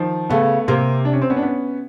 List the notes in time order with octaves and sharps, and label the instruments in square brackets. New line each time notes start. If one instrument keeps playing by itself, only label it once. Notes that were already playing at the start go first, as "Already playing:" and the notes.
Already playing: [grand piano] D#3 F3
[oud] C#3 [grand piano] A3 B3
[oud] C3 [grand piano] A#3 C4
[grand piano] D4
C#4
C4
B3 C#4
D4
B3 C#4